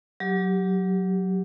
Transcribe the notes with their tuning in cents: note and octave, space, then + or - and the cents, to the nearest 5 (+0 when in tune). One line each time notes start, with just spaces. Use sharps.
F#3 +0 G4 +0